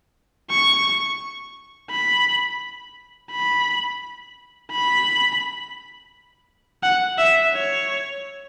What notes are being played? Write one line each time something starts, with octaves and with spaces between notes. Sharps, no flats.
C#6
B5
B5
B5
F#5
E5
C#5